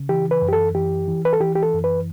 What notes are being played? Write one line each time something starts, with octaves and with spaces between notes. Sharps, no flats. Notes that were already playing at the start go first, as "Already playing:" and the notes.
Already playing: C#3
E3 G4
B4
F#2
G4
A4
E3 G4
E3
B4
A4
E3 G4
G4
A4
F#2
B4